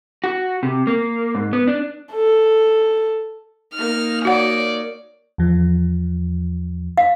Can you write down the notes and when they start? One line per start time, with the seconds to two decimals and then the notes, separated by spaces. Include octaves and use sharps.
0.24 F#4
0.63 C3
0.87 A#3
1.35 G#2
1.53 B3
1.67 D4
2.13 A4
3.74 A#3 D#4 F6
4.25 F#4 C#5 D5 F#5
5.38 E2 F3
6.98 F5